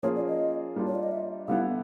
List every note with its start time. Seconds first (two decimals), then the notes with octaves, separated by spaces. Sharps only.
0.03 F3 A#3 C#4 F4 G#4 C#5
0.16 D5
0.28 D#5
0.76 G3 A#3 D4 F4
0.87 C#5
0.95 D5
1.03 D#5
1.11 E5
1.48 D3 G3 B3 E4 F5